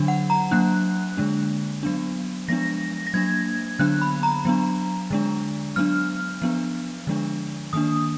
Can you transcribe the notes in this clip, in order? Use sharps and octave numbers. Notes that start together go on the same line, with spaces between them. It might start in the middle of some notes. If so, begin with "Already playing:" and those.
Already playing: D3 F#3 D4
F#5
A#5
F#3 A#3 D4 F#6
D3 G#3 D4
F#3 B3 D4
F3 G#3 B3 D4 A#6
A#6
F#3 A#3 D4 G#6
D3 F#3 B3 D4 F#6
B5
A#5
F#3 B3 D4
D3 G#3 D4
F#3 B3 D4 F6
F3 B3 D4
D3 F3 G#3 D4
D#3 A#3 D4 D#6